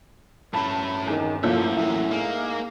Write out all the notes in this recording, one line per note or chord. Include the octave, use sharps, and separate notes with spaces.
G2 A3 C#4 E4 A5 B5
E2 D#3
F#2 A2 F3 A3 A#3 E5
E2 E3 A#3 E4
A#3 D#4 G#4